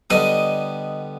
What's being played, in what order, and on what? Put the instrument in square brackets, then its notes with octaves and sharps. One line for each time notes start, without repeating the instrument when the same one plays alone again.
[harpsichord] D3 G3 B3 [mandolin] D#5